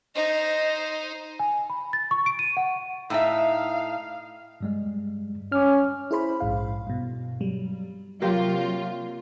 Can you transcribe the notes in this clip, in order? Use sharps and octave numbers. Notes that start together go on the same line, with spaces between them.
D#4 C5 D#5
G#5
B5
A6
C#6
D7
D#7
F#5
A2 D#4 E5 F5
G2 G3 G#3
C#4 D6 F6
E4 G#4 C5 B5
A#1 G#2 F5
G2 B2
F#3 G3
C3 F#3 A#3 F4 G4